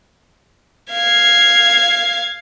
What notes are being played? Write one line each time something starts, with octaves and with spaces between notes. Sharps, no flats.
F5 G#6